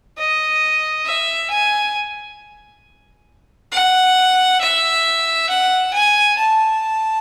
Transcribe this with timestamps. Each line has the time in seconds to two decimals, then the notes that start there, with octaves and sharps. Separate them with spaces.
0.18 D#5
1.06 E5
1.50 G#5
3.72 F#5
4.61 E5
5.49 F#5
5.93 G#5
6.38 A5